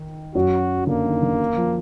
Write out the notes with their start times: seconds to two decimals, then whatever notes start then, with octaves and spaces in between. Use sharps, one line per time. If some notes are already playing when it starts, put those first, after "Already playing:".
Already playing: D#3
0.35 F#2 F#3 F#4
0.87 D3 A#3
1.05 D#3
1.22 D3
1.57 F3